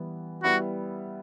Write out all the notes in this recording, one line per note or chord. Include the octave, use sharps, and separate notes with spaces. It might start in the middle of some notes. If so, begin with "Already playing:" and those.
Already playing: E3 G3 B3
G3 B3 E4 F#4